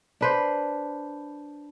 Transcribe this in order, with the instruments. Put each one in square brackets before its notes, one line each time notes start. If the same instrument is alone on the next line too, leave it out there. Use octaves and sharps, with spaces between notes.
[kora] D4 B4 C5